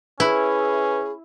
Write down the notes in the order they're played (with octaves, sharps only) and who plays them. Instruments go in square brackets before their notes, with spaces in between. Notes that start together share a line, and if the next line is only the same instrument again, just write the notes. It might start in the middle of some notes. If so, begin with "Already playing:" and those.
[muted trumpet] C#4 [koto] E4 [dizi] G#4 [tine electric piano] B4